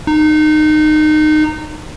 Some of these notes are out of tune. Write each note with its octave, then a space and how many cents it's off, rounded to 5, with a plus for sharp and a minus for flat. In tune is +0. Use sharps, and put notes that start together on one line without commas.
D#4 -25